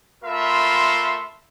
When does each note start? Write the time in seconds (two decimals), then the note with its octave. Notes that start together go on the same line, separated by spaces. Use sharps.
0.24 A3 F4 A#4 E5 B5 C6